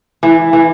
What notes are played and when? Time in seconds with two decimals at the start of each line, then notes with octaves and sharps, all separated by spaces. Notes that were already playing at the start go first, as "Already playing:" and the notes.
0.23 E3
0.53 E3